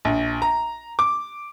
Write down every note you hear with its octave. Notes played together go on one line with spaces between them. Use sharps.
A#1
A#5
D6